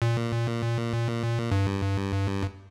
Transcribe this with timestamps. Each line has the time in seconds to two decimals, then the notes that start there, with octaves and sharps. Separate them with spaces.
0.02 A#2
1.51 G2